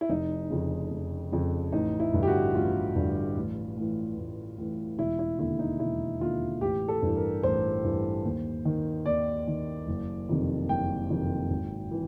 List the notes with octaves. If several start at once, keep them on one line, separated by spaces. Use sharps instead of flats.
E4
F1 D#4
F2 C#3
F1
F2 C#3
A1 D#4
E4
G2 D3
G4
F#4
A1 F4
G2 D3
A1
A2 E3
A1
A2 E3
E1 E4
E4
D#2 D3 E4
D#4
E1 E4
D#2 D3 F4
A1 G4
A4
G2 E3
A#4
A1 C5
G2 E3
D#2
D#3
D#2 D5
D#3
F#1
F2 C3 D#3
F#1 G5
F2 C3 D#3
G#1
E3